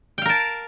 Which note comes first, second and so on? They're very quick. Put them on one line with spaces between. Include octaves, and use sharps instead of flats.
G5 F5 A#4 A5